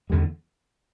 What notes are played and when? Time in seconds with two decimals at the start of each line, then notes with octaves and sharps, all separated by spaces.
0.10 E2 D3 G3